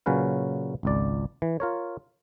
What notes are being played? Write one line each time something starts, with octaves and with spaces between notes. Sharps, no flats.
A#2 C#3 F#3 C#4 B4 F5
G#1 C#2 D5
E3
F4 A#4 C#5